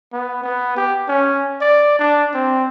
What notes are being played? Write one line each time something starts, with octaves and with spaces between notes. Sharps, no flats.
B3
B3
G4
C#4
D5
D4
C4